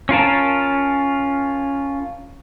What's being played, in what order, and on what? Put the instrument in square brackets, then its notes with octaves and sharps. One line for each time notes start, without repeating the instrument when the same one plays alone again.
[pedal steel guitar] C#4 F4 A#4 A5